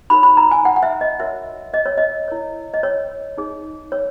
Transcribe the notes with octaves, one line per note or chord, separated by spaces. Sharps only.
D#4 F#4 A#4 C#5 B5
B5
A#5
G#5
F#5
F#5
E5
D#5
F#4 A#4 C#5 E5
D#5
C#5
D#5
E4 A#4 C#5
D#5
C#5
D#4 G#4 C#5
C#5